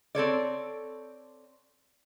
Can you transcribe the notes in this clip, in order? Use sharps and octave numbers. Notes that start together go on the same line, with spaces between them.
C4 A4 C#5 D5